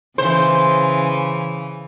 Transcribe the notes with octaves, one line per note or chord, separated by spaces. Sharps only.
C#3 E3 C5